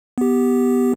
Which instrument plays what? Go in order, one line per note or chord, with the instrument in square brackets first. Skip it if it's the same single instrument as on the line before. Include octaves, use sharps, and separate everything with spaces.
[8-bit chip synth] B3 G4